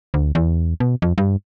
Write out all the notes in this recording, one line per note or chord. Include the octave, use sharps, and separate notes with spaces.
D2
E2
B2
F2
G2